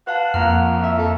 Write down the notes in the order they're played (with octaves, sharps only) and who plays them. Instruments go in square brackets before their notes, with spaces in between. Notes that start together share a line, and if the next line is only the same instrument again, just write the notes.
[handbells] B4 F5 A5 [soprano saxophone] F#5
[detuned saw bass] F2 [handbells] A#3 A#5 F6
[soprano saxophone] E5
A4